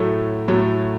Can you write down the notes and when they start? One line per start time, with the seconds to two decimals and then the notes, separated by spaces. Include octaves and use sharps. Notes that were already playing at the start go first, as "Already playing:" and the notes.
Already playing: A2 F#3 A3
0.48 A2 F#3 A3